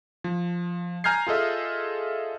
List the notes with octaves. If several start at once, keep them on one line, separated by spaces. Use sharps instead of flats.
F3
G#5 A#5 F6 G6 G#6 C7
F4 G#4 A4 D#5 E5